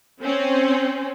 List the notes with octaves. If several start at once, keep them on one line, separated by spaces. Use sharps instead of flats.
C4 C#4